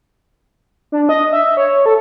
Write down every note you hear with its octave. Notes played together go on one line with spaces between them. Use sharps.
D4
D#5
E5
C#5
A4